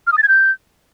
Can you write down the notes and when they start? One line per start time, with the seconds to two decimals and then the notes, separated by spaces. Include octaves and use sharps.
0.07 F6
0.12 D#6
0.18 A6
0.23 G#6
0.28 G6